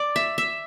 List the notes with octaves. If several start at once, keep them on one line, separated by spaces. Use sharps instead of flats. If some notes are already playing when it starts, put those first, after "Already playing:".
Already playing: D5
E5
E5